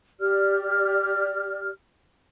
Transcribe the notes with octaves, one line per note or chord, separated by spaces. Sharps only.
G4 D5 F6